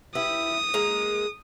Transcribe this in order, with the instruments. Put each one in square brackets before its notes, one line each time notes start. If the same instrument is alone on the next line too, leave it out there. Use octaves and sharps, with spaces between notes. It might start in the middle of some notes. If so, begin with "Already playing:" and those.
[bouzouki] E4 G4 B4 [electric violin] D#6
[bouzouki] G#3 A#3 A#5